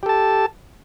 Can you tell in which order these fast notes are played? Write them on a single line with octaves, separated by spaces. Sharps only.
G4 A4 A5